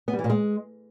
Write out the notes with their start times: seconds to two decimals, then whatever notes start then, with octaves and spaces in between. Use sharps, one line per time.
0.08 B3
0.13 G3
0.19 E3
0.24 A#2
0.30 G#3